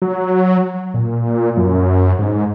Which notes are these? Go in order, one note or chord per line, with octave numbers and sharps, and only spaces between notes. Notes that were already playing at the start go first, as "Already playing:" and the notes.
F#3
A#2
F#2
G#2